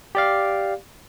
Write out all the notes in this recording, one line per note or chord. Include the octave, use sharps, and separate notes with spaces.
G4 D5 F5